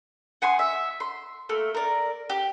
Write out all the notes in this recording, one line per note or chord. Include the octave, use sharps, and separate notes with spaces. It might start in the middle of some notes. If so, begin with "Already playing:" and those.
F#5 G#5 C6 D#6
E5
C6
A3 A#3
A#4 D5
G4